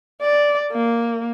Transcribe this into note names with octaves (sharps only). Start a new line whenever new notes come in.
D5
A#3